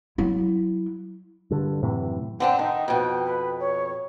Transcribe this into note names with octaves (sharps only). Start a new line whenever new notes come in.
F#3 E4
G2 D3
F#2 A2 C3 E3
D3 C4 D4 G5
D#3 D#4
F2 B2 G5
B4
C#5